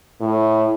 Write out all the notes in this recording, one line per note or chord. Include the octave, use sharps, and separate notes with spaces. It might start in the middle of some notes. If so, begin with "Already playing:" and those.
A2